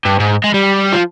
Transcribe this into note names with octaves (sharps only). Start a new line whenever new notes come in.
G2
G#2
G#3
G3
F3